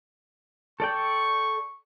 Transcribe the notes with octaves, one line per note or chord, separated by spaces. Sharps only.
A4 D5 G5 C#6